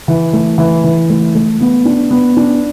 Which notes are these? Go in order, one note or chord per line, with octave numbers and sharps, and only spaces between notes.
E3
A3
E3
E3
A3
A3
B3
D4
B3
D4